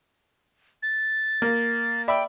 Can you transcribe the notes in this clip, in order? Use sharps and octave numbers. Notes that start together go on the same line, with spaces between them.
A6
A#3
D5 E5 G5 B5